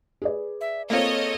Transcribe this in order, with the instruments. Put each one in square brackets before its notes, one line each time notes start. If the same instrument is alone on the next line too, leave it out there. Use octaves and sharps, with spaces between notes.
[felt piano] G#4 B4 D5
[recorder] E5
[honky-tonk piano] A#3 C4 F4 [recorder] A4 [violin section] C#5 D#5